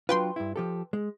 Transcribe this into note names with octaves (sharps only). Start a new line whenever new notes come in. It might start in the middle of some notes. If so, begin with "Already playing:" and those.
F#3 D4 F4 B4 G5 C6
G2 E4
F3 G4 A4
G#3